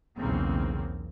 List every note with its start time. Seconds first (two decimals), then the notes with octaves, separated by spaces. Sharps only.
0.17 B1 E2 C#3 A#3 C4